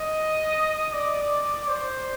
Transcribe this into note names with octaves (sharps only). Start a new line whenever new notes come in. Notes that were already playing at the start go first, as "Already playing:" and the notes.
Already playing: D#5
D5
C5